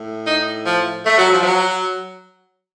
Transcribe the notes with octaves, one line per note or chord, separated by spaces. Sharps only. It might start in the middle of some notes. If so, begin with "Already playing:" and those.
Already playing: A2
D#4
F3
A3
F#3
F3
F#3